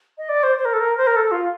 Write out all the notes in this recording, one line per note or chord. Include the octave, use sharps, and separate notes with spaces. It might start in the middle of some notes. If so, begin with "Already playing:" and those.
D#5
D5
C5
C5
A#4
A4
A#4
C5
A#4
A4
F4